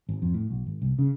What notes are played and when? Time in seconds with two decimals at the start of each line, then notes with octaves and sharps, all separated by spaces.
0.09 G#1
0.22 F2
0.34 A2
0.50 B1
0.66 G#1
0.82 C2
0.99 C#3